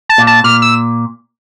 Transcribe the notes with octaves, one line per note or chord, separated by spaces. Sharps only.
A5
A#2
A5
A#2 F6
E6